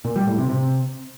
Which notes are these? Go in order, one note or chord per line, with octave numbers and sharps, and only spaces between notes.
A#2
G3
A2
C3
C3